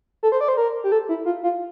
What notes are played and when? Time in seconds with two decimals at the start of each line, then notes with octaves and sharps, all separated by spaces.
0.23 A4
0.32 C5
0.41 D5
0.48 C5
0.57 A#4
0.84 G4
0.92 A4
1.09 E4
1.26 F4
1.43 F4